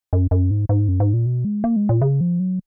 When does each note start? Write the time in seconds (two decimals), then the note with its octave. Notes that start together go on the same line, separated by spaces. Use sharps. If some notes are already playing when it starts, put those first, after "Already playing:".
0.13 F#2
0.31 F#2
0.51 G#2
0.69 G#2
0.88 F#2
1.00 G#2
1.14 A#2
1.26 B2
1.45 G#3
1.64 A#3
1.76 G#3
1.89 A#2
2.02 C#3
2.21 F3
2.39 F#3